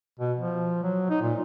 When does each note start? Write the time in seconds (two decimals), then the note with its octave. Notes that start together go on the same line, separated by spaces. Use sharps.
0.20 B2
0.38 F3
0.83 F#3
1.10 D#4
1.22 A#2